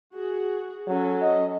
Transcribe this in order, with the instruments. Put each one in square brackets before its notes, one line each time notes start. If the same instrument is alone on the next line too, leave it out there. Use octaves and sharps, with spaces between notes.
[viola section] F#4 G#4
[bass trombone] F#3 [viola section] C#4 A4
[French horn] D#5